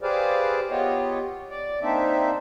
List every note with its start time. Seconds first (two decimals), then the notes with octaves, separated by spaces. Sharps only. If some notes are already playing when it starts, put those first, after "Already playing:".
0.01 G4 G#4 B4 C5 D5 F5
0.70 B3 F4 G4 C#5 D#5
1.50 D5
1.82 A#3 C4 D4 D#4 E5